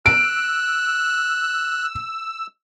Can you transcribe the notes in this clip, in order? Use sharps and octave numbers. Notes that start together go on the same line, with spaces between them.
E6 F#6 D7